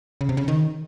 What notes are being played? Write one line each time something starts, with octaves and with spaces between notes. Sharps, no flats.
C#3
C3
C#3
D#3